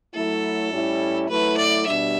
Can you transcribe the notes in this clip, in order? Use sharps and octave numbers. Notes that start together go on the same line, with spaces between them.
F#3 A3 E4 A4
A2 G3 C#4 E4
F#3 A3 E4 B4
D5
B2 G3 D4 E5